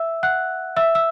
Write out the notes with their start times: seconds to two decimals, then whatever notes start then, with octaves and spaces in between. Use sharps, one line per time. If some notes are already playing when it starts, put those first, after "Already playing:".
Already playing: E5 E6
0.23 F#5 F#6
0.77 E5 E6
0.95 E6